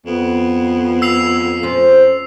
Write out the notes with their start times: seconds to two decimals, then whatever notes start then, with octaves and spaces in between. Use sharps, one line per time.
0.06 F2 B3
1.02 E6 C7 F7
1.63 F3 C4 C#4